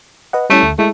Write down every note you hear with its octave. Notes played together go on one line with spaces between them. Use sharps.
B4 D#5 F#5
G3 A3 C#4 E4
D2
G#3 A3 E4